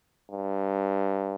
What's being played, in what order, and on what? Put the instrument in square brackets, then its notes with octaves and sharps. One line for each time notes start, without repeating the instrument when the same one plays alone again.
[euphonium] G2